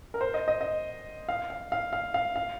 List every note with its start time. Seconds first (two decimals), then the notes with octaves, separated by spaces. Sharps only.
0.14 A#4
0.21 C5
0.34 D#5
0.48 D#5
0.61 D#5
1.29 F5
1.50 F5
1.72 F5
1.93 F5
2.14 F5
2.36 F5